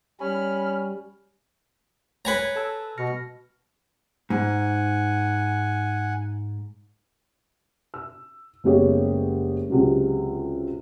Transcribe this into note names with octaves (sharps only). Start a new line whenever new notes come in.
G3 C#4 B5 F6
B4 C#5 G#5 A#5 G#6 C#7
A4 A5 E6
B2 F6 A#6 C#7
G#2 F#5 G#5
E6
F#1 G3 G#3 B3 G4 C#5
C#2 C3 F#3 G#3